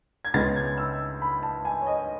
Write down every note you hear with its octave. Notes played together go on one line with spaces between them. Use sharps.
G#6
C#2 C#3 G#3 B3 A6
G#6
E6
B5
A5
G#5
C#5
D#5